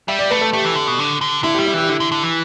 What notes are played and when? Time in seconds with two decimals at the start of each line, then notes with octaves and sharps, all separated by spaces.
0.08 G3 E5
0.19 D5
0.31 A3 B4
0.41 A4
0.53 A3 G4
0.65 E3
0.76 D3
0.87 B2
0.99 D3
1.21 D3
1.43 D3 E4
1.54 G4
1.59 G3
1.66 E4
1.74 E3 G4
1.89 D3 E4
2.00 D3
2.12 D3
2.23 E3